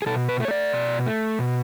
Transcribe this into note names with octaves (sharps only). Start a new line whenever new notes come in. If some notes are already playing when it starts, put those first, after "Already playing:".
G#4
B2 A4
B4
A3
C#5
D5
B2
A3
B2